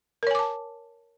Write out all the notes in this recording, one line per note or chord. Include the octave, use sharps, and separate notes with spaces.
A#4 C#5 G#5 A5 D6